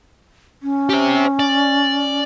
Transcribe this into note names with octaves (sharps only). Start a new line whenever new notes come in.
C#4
G4 C5
D5